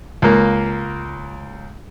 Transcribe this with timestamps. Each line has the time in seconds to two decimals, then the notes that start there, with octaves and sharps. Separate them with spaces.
0.22 C#2 A#3